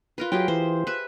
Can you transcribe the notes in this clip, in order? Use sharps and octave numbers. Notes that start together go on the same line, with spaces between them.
F4 A#4 B4
F#3 F4 G4 G#4 G5
E3 C5
B4 E5